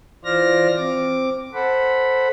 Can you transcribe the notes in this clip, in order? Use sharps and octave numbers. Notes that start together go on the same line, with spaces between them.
E3 F4 C5 D5 F6 A#6
C4 D6
A4 C5 F#5 B5